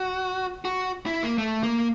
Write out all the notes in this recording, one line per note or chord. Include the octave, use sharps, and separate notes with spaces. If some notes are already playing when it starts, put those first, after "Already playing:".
Already playing: F#4
F#4
E4
A#3
A3
A#3